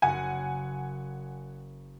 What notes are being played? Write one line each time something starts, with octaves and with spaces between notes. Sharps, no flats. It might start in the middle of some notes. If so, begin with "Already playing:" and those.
F#1 F#5 G#5